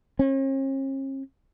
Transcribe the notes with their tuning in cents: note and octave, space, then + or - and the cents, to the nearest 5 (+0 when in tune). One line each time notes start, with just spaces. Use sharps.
C#4 -45